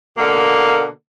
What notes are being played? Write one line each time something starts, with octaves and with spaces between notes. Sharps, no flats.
B2 D3 A#3